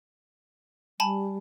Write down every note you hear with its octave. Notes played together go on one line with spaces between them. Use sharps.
G3 G#5 A5 B5